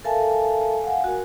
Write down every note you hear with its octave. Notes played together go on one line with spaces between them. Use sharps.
A4 A#4 E5 F5 G#5 A5
F5 F#5 G#5
F#4 A#4